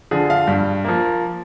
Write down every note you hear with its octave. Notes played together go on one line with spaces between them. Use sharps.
D3 F3 G#4
F5
G2
F3 A#3